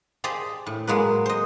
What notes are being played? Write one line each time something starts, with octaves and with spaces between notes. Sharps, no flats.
G4 G#4 C5 D5 D#5 A5
A2
F#3 G#3 A#3 B4
C5 D#5